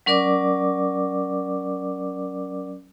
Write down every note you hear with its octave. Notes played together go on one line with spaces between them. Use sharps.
F#3 C#4 A#4 D5 D6